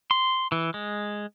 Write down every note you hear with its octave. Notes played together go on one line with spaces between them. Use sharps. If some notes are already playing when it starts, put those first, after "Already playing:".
C6
E3
G#3